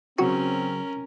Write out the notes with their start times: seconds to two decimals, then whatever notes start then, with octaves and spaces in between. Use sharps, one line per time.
0.19 C#3 F#3 C4 C#4 F#4 A#4